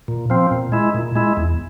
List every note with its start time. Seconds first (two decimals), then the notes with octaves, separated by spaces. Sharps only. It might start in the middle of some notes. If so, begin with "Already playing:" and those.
0.08 A#2
0.30 F3 C4
0.51 A#2
0.72 G#3 E4
0.95 A#2
1.16 G#3 E4
1.37 E2